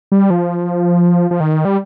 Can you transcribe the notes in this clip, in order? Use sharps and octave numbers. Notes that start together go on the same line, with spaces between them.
G3
F3
F3
D#3
G3